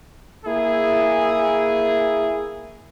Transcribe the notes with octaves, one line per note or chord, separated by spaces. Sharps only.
A#3 E4 G#4